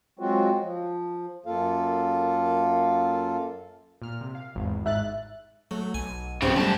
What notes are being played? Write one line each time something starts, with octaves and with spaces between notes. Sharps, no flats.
F#3 G#3 C4 F4 F#4
F3
F#2 A#3 F4 A4 F5
A#2 F6
C3
F5
G#1 E2
G#2 E5 F#6 A6
F#3 A3
B1 G#5
B1 G2 C#3 F3 C4 G4
F#2 G3 A3 A5